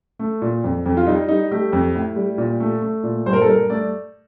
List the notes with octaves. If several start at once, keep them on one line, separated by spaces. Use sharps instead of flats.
A3
A#2
F2
F2
F4
G3 D#4
G3 D#4
A3 G4
F2
A2
G3
A#2
A3
A3
A#2
G2 C5
A#4
A4
G2 A#4
A3 D5